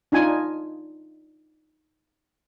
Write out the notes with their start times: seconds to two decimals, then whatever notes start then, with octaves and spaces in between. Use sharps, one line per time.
0.12 D4 D#4 F4 G#5